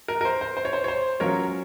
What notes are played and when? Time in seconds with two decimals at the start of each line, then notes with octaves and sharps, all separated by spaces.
0.08 A#4
0.21 A#4
0.25 C5
0.41 C5
0.57 C5
0.65 C#5
0.73 C5
0.84 C#5
0.88 C5
1.20 F#3 C#4 F4 A#4 C#5